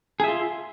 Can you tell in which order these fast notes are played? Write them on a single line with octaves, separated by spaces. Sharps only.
G#4 E5 F4